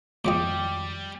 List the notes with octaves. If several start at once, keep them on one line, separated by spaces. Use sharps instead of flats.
F2 G#2 D#3 F3 G3 D#5 G5 D6